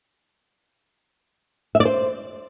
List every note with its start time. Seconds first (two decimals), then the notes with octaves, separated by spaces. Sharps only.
1.75 E5
1.80 D5
1.85 C5